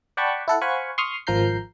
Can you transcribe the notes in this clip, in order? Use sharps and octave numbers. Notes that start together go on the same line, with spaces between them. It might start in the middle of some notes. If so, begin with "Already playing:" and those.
D5 F#5 G5 A5 B5 C#6
E4 A4 F#5
C5 F5 F#5 G#5 B5 C#6
C6 C#6 D#6 F6
G#1 F3 A#4 A#5 G6 C7